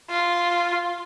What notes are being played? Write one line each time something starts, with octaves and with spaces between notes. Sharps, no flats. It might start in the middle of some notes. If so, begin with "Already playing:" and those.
F4